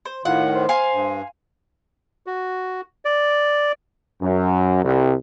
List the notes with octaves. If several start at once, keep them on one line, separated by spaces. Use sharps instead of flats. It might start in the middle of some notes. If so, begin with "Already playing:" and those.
C5
A2 D#3 F4 F#5
C5
F5 G#5 C6
G2
F#4
D5
F#2
C2